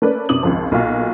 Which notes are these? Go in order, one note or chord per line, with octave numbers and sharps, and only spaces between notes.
A3 A#3 C#4 B4 D5
F#2 C3 D6 D#6 F#7
G#1 C#2 F3
B1 A#2 F4 F#4